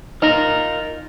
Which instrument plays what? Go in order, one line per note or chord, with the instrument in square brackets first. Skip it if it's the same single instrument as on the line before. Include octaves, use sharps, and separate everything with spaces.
[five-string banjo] D#4 [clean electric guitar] F4 A#4 A#5